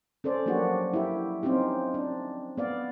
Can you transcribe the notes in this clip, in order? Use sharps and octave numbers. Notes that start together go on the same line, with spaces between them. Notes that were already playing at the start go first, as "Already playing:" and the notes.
C#4 A4 C5 D5
F3 F#3 A#3 D4 F#4 G4
E4 G4
C4 C#4 D#4 F4 G4
D4
B3 D5 F5